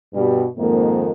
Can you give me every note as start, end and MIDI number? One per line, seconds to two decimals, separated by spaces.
0.14 0.42 43
0.14 0.42 47
0.14 0.42 55
0.57 1.11 41
0.57 1.11 44
0.57 1.11 51
0.57 1.11 58